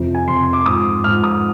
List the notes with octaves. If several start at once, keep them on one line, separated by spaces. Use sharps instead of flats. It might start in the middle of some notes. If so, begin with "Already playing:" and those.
Already playing: F2 C3 F3
G#5
F2 C3 F3 C6
D6
G#2 F3 D#6
G#2 F3 F6
D#6